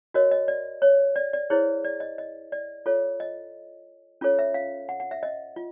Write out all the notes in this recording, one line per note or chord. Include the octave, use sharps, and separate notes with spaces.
F#4 A#4 C#5 D#5
D#5
D5
C#5
D5
D5
E4 G#4 C5 C#5
D5
D#5
D#5
D5
F4 A4 C#5
D#5
C#4 F4 A4 C#5
E5
F5
F#5
F#5
E5
D#5
F4